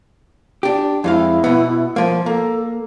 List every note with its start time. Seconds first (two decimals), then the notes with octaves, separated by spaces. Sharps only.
0.63 D4 G4
1.04 F2 G#3 E4 F5
1.44 B2 B3
1.96 F3 A#3
2.26 A#3 A4